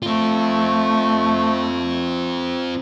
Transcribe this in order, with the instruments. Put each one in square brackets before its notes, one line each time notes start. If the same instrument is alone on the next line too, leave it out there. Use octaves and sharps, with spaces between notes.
[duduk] A3 [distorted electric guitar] C4 F4